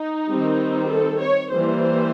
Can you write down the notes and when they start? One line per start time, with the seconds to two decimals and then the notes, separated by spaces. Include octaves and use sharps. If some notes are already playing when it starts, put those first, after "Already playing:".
Already playing: D#4
0.30 D#3 G3 C4
0.89 A4
1.20 C#5
1.51 E3 G3 A#3 C5